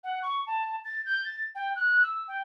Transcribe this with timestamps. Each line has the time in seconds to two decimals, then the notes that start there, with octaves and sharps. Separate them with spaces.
0.04 F#5
0.23 C#6
0.47 A5
0.84 A6
1.06 G6
1.25 A6
1.55 G5
1.76 F#6
2.03 E6
2.28 G5